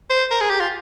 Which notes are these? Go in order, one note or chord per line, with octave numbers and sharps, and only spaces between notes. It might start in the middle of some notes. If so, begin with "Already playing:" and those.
C5
A#4
G#4
G4
F4